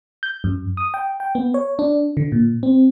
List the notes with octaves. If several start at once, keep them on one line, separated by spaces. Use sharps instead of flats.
G6
F#2
D#6
G5
G5
B3
C#5
D4
D3
A#2
C4